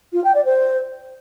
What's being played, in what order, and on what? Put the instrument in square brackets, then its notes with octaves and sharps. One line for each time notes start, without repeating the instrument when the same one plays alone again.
[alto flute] F4
G5
D5
C5